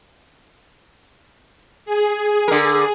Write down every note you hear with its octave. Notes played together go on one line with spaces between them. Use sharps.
G#4
D3 A#4